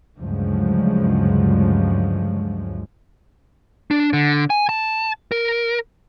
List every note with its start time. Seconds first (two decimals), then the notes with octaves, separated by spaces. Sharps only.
0.18 D2 G2 C#3 F3 F#3 G#3
3.91 D4
4.13 D3
4.50 G#5
4.69 A5
5.32 A#4